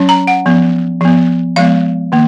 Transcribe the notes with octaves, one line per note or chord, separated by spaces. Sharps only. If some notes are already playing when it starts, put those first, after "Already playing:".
Already playing: F#3 C#4
A#5
F#5
F3 B3
F3 B3
F3 G#3 B3 F5
D#3 A#3